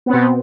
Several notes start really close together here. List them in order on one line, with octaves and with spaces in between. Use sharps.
B3 C4 B2